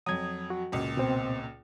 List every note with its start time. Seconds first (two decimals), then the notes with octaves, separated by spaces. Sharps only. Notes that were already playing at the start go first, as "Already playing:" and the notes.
0.06 F2 F#3 D#6 G#6
0.50 F#4
0.72 C#2 A#2
0.97 B2 C4